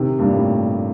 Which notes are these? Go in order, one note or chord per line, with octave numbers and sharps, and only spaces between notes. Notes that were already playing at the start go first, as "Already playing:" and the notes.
Already playing: C3 D#3
G2 A#2
A2